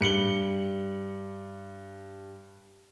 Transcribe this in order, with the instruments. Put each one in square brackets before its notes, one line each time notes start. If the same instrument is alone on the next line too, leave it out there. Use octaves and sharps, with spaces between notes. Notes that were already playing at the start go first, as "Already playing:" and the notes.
[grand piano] G2 C#7 F#7 G7